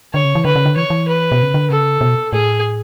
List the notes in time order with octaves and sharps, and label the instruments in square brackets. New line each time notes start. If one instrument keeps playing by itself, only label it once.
[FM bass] D3 [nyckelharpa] C#5
[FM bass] C#3
E3
[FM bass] D3 [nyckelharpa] B4
[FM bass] C#3
D3
[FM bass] E3 [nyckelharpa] C#5
[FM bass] E3
[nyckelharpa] B4
[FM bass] B2
C#3
D3
[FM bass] C#3 [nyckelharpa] A4
[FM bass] B2
[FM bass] A2 [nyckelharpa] G#4